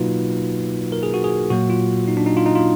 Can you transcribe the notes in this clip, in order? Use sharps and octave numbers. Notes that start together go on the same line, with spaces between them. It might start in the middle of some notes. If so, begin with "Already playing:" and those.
Already playing: B2 F#3 A#3 D#4 F4 F#4 B4
A#4
G#4
F#4
G#4
A#2 F#3 A#3 F#4
F4
D#4
D4
D#4
F4
D#4
F4